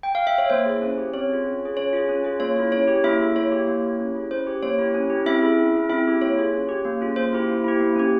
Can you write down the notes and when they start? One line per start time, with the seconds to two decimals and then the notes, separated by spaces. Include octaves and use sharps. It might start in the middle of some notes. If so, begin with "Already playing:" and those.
0.03 G5
0.15 F5
0.27 E5
0.38 C#5
0.50 A#3 C5
0.66 E4 G#4
0.82 C#4
0.98 G4
1.14 C4 C#5
1.30 F4 G#4
1.45 C#4
1.61 F4 G#4
1.77 C#4 C#5
1.93 F4 G#4
2.09 C#4
2.24 F4 G#4
2.40 A#3 C#5
2.57 E4 G#4
2.72 C#4 C#5
2.88 G4
3.04 A#3 E4 E5
3.20 E4 G#4
3.36 A#3 C#5
3.51 E4 G4
3.68 A#3
3.84 E4 G4
3.99 C#4
4.15 E4 G#4
4.31 C#4 C5
4.47 G4
4.62 A#3 C#5
4.79 E4 G4
4.94 C#4
5.10 E4 G4
5.26 C4 E4 E5
5.42 E4 G#4
5.58 C#4
5.73 E4 G#4
5.89 C4 E4 E5
6.06 E4 G4
6.21 A#3 C#5
6.37 F4 G#4
6.53 C#4
6.69 G4
6.85 A#3
7.01 C#4 F4 G#4
7.16 A#3 C5
7.33 E4 G4
7.48 A#3
7.64 E4 G4
7.80 A#3
7.96 C#4 G4